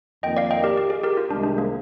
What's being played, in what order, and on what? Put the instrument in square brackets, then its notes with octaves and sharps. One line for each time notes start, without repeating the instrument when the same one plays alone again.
[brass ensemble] F2 D#3 A#3 F4 [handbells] D#5 G5
[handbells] D5 F5
D#5 G5
G4 A#4
G4
G#4
G4 A#4
F4
[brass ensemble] C2 C3 D#3 G#3 [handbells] D4
[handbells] D4
A#3